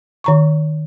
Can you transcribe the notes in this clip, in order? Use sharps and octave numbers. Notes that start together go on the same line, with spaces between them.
D#3 A#5 C#6